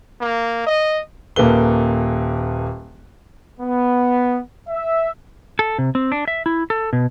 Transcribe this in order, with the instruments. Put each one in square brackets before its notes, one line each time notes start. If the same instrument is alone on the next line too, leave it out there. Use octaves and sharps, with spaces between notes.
[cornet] A#3
D#5
[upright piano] D#1 A#3 A4 B4 G7
[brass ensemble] B3
E5
[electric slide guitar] A4
C3
C4
D4
E5
E4
A4
B2